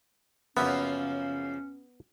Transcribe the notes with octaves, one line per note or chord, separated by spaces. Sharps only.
F#2 C#3 F3 A#3 B3 C#4 E5